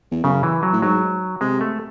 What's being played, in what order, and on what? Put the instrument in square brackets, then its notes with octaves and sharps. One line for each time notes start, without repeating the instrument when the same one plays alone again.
[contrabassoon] E2
[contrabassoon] F#2 [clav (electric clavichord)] C#3
[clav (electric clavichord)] E3
F#3
[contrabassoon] A2
[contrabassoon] G#2 [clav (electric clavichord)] F#3
[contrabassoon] C3 [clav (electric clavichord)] G#3
[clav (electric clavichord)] A3